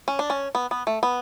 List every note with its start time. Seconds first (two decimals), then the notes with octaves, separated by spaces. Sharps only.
0.08 C#4
0.19 D4
0.30 C#4
0.55 B3
0.71 B3
0.87 A3
1.03 B3